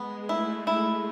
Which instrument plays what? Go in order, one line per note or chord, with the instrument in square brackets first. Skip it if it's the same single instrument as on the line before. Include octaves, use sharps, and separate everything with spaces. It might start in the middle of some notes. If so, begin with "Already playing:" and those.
Already playing: [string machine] G#3 [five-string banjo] B3
[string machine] A3 [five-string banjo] E4
[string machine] A3 [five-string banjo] E4